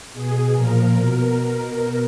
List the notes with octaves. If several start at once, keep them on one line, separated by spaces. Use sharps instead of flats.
B2 G#4
A#2 F3 A#4
B2